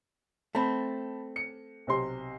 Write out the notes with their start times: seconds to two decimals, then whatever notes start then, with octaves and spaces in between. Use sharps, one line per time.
0.55 A3 C4 A5 B5
1.36 C#7
1.87 B1 C3 C6